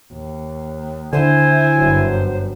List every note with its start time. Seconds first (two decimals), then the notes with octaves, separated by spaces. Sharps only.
0.12 D#2
1.13 D3 E4 C5 G#5
1.76 G1 F#2